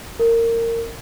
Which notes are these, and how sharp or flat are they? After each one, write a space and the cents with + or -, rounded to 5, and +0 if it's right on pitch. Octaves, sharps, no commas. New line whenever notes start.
A#4 -20